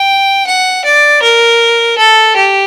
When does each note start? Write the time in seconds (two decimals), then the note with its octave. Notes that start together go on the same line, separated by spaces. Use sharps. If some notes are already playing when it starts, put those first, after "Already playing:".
Already playing: G5
0.47 F#5
0.85 D5
1.22 A#4
1.98 A4
2.36 G4